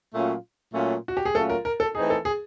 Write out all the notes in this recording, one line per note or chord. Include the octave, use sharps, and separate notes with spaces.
A#2 F#3 A3 C#4 F4
A#2 F#3 A3 C#4 F4
F#4
G4
G#4
A#2 F#3 A3 C#4 F4 A4
A#4
A#4
A4
E3 A3 C4 D#4 G#4
A4
G#4